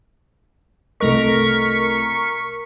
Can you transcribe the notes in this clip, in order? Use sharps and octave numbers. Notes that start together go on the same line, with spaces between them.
C2 A3 A#4 D#5 C#6 B6